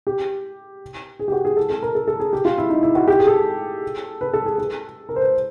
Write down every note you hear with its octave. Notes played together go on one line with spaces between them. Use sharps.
G4
G#4
G4
F#4
G#4
A4
A4
A#4
A4
A4
G#4
G4
F4
E4
D#4
E4
F#4
G4
G#4
A4
B4
A4
G#4
A4
A#4
C5
B4